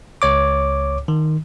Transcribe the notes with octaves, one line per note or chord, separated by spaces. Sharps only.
C#2 C#5 D6
D#3